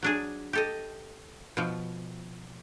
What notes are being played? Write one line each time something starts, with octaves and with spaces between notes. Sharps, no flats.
F#3 D4 G#4
G4 A4 D#5
B2 F3